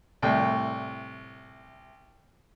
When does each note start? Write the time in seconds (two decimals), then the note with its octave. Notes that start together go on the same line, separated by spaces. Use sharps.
0.22 C2 A2 G5